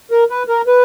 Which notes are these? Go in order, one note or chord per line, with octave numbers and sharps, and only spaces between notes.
A#4
B4
A#4
B4